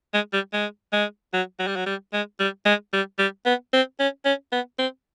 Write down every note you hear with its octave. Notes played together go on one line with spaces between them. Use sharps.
G#3
G3
G#3
G#3
F#3
F#3
G3
F#3
G3
G#3
G3
G#3
G3
G3
B3
C4
C#4
C#4
B3
C4